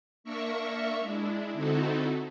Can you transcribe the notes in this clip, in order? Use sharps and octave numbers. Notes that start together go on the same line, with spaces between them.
A#3 D4 A#4 E5 C#6
G#3 D4 E4
D3 C4 D#4 E4 F#4 A4